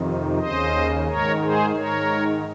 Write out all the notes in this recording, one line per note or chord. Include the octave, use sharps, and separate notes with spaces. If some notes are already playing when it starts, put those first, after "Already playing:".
Already playing: F2 C3 D#3
D#2 C#3 C5 D#5
G#2 D#3 A#4 C#5
G#4 C5
G#2 D#3 A#4 C#5